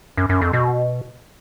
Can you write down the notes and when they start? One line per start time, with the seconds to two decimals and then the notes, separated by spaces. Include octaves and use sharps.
0.17 F#2
0.29 F#2
0.41 F2
0.53 B2